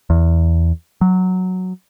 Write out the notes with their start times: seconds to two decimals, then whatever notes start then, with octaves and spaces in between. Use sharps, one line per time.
0.10 E2
1.01 F#3